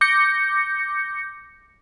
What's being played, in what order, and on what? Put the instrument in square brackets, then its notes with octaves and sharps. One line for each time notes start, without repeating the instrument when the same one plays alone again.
[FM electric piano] D6 G6 A#6 C#7